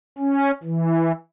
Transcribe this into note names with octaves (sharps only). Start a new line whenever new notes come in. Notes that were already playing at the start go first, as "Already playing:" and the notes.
C#4
E3